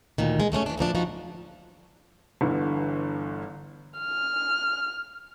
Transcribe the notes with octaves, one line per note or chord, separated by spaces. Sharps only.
D2 A#2 D#3
G#3
F#3 A3 C4 C#4
E3 D4
D2 A#2 F3 D4
F3 D#4 F#4
G1 G2 D3 E3
F6